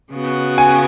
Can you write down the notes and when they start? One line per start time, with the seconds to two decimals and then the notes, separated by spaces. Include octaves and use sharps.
0.11 C#3 B3 F#4
0.58 G#5